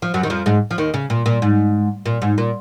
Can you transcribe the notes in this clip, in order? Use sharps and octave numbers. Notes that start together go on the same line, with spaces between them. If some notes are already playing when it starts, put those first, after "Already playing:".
F3
F#2 F#3
D#3
F2 F3
G#2 G#3
F3
D#2 D#3
C#3
A#2
A#2
G#2
A#2
G#2
A#2